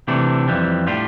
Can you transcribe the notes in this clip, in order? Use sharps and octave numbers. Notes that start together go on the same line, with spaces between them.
C3 E3 A3 D4
F2 E3 G3
A2 G3 D4 F4